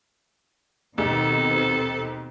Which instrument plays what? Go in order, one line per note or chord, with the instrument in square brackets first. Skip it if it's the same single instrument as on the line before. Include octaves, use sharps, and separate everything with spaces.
[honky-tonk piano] D#2 [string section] B2 D#3 C4 [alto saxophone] A4